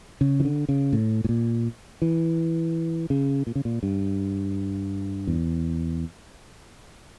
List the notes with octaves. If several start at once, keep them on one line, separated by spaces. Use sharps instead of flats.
C#3
E3
D3
C#3
A2
A2
A#2
E3
C#3
A#2
C#3
A#2
G2
E2